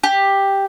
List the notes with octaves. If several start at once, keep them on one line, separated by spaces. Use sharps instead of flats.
G4